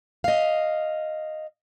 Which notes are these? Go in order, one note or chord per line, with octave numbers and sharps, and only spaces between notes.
D#5 F5